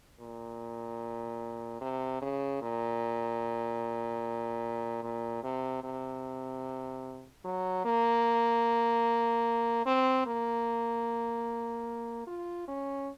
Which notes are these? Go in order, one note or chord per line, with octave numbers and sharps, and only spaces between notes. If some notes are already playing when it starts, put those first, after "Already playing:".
A#2
C3
C#3
A#2
A#2
C3
C3
F#3
A#3
C4
A#3
F4
C#4